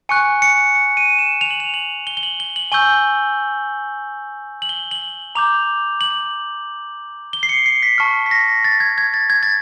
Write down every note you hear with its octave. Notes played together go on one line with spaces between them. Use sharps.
G#5 C#6 F#6 C#7
C#7
C#7
D#7
E7
F7
F#7
F7
F#7
G7
G7
F#7
G7
F#7
G#5 C#6 E6 G6 G7
F#7
G7
F#7
A#5 D6 G6 F7
F#7
G7
C7
C#7
C7
B6
A5 C#6 F6
B6
A#6
A6
G#6
G#6
A6
G#6
A6